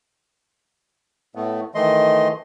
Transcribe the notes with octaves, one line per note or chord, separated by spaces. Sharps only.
A2 A3 B3
D#3 E3 A3 D#5 C6